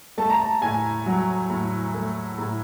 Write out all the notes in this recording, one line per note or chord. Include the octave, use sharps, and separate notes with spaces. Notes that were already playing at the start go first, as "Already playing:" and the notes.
A3 A5
A#5
A5
A2 G#5
F#3
A2
A3
A2